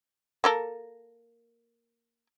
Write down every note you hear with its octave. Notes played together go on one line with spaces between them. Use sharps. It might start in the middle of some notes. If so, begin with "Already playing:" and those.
A#3 A4 A#4